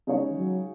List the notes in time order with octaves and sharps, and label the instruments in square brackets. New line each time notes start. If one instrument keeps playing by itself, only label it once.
[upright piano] C#3 G#3 D#4 G#4 C#5
[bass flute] E3
F#3